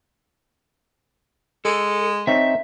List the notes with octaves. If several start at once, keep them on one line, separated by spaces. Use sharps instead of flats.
G#3 A4
C4 D#4 C#5 E5